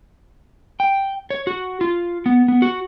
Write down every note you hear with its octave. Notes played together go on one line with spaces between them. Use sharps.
G5
C#5
F#4
F4
B3
B3
F#4